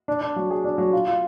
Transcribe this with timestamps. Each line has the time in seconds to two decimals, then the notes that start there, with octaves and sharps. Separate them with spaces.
0.08 D4
0.21 D4
0.36 F#3
0.50 G#4
0.64 D4
0.78 F#3
0.93 F4
1.07 F4